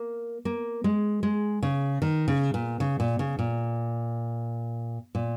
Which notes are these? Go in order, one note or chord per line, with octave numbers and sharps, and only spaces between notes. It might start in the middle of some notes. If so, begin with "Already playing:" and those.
Already playing: A#3
A#3
G#3
G#3
C#3
D#3
C#3
A#2
C#3
A#2
C#3
A#2
A#2